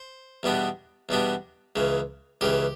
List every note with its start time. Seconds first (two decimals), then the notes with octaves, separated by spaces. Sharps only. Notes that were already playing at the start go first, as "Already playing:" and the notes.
Already playing: C5
0.43 E2 B2 G3 B3 D4
1.09 E2 B2 G3 B3 D4
1.76 C#2 C#3 E3
2.41 C#2 C#3 E3 G4